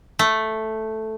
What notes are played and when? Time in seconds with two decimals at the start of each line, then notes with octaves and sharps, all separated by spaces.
0.19 A3